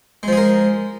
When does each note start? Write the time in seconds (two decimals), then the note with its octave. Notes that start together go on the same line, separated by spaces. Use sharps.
0.23 G#3
0.28 F3
0.33 G#4
0.37 A#4